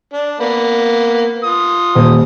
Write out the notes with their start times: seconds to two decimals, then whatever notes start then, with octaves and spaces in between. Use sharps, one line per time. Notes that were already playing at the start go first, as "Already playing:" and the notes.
0.14 D4
0.40 A#3 B3
1.43 F4 D#6
1.95 D#1